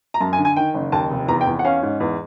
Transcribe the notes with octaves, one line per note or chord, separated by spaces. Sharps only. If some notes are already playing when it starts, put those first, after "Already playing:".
A#5
F#2 A5
G#5
D3
G#5
D#3 G5
F#1
D#2 A5
F1
E2 A#5
G5
E2
F#5
C#4 F5
G#2
E2